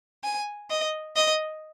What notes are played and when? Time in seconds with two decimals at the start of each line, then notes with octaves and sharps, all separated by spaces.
0.24 G#5
0.70 D#5
1.16 D#5